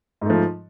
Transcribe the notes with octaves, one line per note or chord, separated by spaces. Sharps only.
G#2 F3 A3